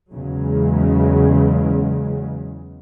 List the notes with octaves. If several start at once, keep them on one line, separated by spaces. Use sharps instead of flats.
E2 C#3 F#3 G#3